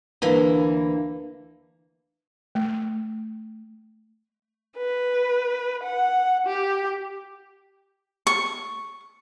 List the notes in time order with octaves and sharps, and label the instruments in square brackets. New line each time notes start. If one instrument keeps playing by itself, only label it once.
[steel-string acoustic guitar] D2 E3 A#3
[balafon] A3
[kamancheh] B4
F#5
G4
[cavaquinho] C#6